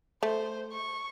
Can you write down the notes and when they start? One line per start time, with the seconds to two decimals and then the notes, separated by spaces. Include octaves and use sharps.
0.23 A3 C5
0.73 C#6